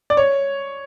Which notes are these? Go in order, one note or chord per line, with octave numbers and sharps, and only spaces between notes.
D5
C#5